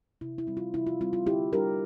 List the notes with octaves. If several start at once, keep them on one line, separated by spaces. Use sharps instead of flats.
C3 E4
E4
G3 C4
F4
C3 E4
F4
G3 C4 F4
F4
D3 E4 G4
G3 D4 G4 A#4